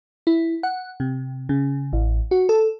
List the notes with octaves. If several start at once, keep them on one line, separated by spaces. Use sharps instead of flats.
E4
F#5
C3
C#3
A1
F#4
A4